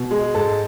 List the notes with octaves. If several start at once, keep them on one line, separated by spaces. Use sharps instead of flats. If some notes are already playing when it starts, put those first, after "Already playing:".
Already playing: B2
G#3
G#2 A4 A5